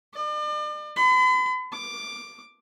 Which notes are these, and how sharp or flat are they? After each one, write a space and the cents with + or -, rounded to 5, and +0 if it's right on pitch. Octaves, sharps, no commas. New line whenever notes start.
D5 +40
B5 +45
D6 +5